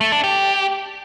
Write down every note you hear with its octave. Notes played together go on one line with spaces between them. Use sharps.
A3
D4
G4